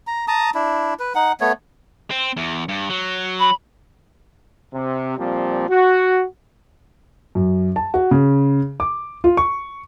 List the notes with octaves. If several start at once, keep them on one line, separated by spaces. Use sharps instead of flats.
A#5
A5 A#5 D#6
D4 E4
B4
D#4 F#5
A3 B3 C#5
C4
E2
G2
F#3
B5
C3
A#2 F3 G3 C4
F#4
F#2
A5
F#4
C#3
D6
F4
C#6